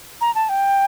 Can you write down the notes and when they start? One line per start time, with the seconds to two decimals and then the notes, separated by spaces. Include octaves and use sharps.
0.21 A#5
0.35 A5
0.49 G5